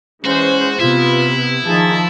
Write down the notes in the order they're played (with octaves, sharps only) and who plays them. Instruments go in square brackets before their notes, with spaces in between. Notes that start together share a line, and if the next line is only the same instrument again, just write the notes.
[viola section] E3 G#3 C5 [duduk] C#4 [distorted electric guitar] F#4
[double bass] C3 [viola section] B3 [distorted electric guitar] E4 [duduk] F4
[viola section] D#3 D#4 A5 [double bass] F3 [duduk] G#4